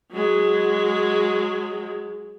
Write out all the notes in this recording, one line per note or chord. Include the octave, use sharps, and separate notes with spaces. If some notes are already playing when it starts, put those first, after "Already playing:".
F#3 G#3